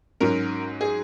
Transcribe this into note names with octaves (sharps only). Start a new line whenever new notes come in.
G#2 F#3 C#4 A#4
G#4